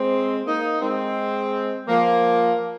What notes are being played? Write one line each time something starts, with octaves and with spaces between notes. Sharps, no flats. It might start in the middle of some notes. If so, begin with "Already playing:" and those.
Already playing: G#3 C4
A#3 D#4
G#3 C4
F3 A#3